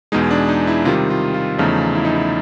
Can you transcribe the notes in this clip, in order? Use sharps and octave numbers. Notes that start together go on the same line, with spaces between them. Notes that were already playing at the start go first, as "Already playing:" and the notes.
E2 B2 G#3 D#4
D4
D#4
E4
C3 D#3 G3 F4
F4
F4
E2 C#3 F3 A3 D#4
E4
D#4
E4